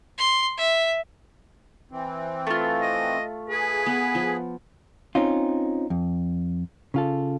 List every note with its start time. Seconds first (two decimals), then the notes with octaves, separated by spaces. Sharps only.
0.18 C6
0.57 E5
1.91 E3 C4
2.47 A3 F4
2.82 D#5
3.49 G#4 B4
3.86 B3
4.15 F3
5.15 C4 C#4 D#4 F4
5.90 F2
6.94 C#3 F4 A4